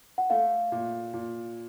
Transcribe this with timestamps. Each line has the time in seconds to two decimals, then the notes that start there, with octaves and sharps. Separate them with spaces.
0.18 F#5
0.30 A3 F5
0.72 A#2
1.14 A#2